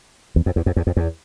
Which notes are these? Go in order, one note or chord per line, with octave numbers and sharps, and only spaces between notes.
E2
F2
E2
F2
E2
F2
E2